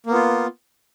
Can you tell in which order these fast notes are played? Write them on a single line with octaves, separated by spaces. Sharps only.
A#3 B3 F4